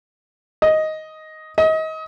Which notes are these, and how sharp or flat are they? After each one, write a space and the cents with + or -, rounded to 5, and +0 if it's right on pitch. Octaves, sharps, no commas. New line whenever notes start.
D#5 +5
D#5 +30